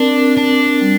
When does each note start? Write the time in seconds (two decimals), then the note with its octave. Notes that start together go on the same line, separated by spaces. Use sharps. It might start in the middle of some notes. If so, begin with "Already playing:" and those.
Already playing: C4 D4 A#4
0.37 C4 D4
0.81 G3